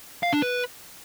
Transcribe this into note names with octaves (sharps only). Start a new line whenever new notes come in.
F5
D4
B4